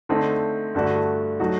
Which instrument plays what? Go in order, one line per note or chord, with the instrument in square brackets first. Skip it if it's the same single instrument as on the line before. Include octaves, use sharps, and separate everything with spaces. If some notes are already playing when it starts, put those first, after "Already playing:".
[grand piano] D3 A3 C4 D#4
G2 D3 A3 D4 F#4
F#3 A3 D#4 F#4